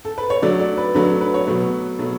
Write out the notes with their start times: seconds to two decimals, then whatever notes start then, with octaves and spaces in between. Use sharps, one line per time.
0.05 A4
0.18 B4
0.30 C#5
0.42 D3 F#3 A3 D5
0.59 D5
0.77 B4
0.94 D3 F#3 A3 B4
1.21 B4
1.34 C#5
1.47 B2 F#3 A3 B4
1.99 B2 F#3 A3